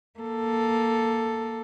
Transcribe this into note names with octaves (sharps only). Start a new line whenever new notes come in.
A#3 A4